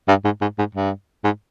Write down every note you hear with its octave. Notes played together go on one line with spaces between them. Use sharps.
G2
G#2
G#2
G#2
G2
G#2